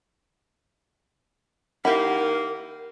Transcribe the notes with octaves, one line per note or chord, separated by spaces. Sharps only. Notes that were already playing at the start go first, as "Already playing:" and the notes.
D#3 A#3 E4 G4 A#4 F#5